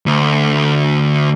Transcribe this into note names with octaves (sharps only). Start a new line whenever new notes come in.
D2